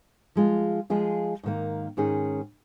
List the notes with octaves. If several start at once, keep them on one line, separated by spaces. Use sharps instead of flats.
F3 G#3 F4
F3 G#3 F4 G#4
G#2 D#3 A#3
G#2 D#3 C#4 G#4